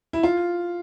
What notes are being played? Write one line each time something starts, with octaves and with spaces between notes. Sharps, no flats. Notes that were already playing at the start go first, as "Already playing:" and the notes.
E4
F4